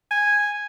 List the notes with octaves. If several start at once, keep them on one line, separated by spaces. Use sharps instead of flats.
G#5